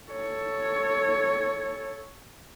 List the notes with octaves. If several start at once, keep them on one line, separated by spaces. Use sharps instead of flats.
A4 C#5